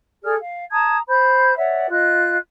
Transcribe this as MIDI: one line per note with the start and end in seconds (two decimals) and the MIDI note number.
0.23 0.34 68
0.23 0.34 69
0.23 0.34 74
0.23 0.34 89
0.41 0.63 77
0.71 0.98 81
0.71 0.98 82
0.71 0.98 87
0.71 0.98 92
1.08 1.56 72
1.08 1.56 83
1.08 1.56 91
1.57 1.88 73
1.57 1.88 74
1.57 1.88 76
1.57 1.88 78
1.90 2.36 65
1.90 2.36 75
1.90 2.36 90